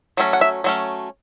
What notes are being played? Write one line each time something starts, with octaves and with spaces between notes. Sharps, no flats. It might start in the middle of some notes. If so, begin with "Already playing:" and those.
F#3 A3 C#4
F#5
E5
F#3 A3 C#4